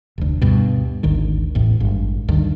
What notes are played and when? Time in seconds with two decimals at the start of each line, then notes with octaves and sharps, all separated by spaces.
0.18 F1 D2
0.42 D2 G2 B2
1.03 G#1 D2 D#3
1.55 A1 E2 A2
1.80 G#1 G2
2.29 D2 G2 D#3